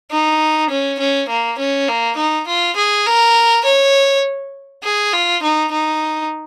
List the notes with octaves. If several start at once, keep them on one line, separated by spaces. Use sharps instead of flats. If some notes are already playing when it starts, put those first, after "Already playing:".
D#4
C#4
C#4
A#3
C#4
A#3
D#4
F4
G#4
A#4
C#5
G#4
F4
D#4
D#4